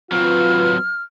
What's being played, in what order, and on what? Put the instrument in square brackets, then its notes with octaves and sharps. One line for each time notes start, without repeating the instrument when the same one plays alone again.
[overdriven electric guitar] F#3 C4 [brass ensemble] F4 B4 [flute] F6